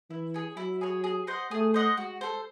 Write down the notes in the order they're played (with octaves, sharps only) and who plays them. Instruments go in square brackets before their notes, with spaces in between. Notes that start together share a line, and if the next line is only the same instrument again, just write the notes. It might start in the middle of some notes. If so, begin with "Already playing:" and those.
[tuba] E3 [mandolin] E4
[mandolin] G#4 C#5
[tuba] F#3 [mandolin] E4
[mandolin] G#4 C#5
G#4
C5 D#5 F#5
[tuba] A3 [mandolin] G#4
[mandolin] C5 D#5 F#5
[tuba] G#3 [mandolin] F#4
[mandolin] A4 C5